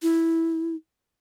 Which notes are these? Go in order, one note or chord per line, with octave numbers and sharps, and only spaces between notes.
E4